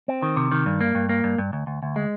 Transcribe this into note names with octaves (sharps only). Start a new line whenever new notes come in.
C4
D#3
C3
D#3
G2
A#3
G2
A#3
G2
G2
D2
D2
D2
G#3